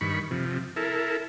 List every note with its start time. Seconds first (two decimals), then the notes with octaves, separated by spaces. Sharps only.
0.01 G2 D#3 B5 C#6
0.31 C3 F3
0.76 E4 A4 A#4